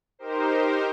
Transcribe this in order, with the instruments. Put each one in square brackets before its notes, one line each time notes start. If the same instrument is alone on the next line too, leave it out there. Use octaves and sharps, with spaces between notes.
[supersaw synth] D#4 G4 A#4 C5